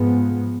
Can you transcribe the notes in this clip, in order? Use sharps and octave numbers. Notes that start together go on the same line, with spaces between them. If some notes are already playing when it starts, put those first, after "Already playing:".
Already playing: G#2 F3 G#3 B3